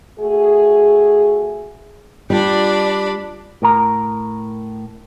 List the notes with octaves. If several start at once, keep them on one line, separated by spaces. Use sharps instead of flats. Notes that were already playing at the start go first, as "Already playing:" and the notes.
A3 F#4 G#4
G3 D4 F4 D5 B5
A2 A#4 A#5